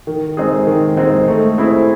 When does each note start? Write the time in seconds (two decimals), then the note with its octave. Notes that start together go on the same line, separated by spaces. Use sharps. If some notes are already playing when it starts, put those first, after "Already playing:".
0.07 D#3
0.37 G#3 C4 D#4 G#4
0.67 D#3
0.97 G#3 C4 D#4 G#4
1.27 A3
1.58 C4 E4 G#4